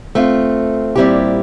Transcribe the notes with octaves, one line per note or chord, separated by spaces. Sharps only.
A3 C4 F4
A#2 G3 C4 E4 G4